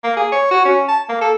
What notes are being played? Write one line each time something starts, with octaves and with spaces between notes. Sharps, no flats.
A#3
G#4
C#5
F#4
C#4
A5
A#3
A4